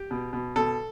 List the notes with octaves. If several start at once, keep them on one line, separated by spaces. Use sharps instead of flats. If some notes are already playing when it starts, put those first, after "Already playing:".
Already playing: G4
B2
B2
B2 A4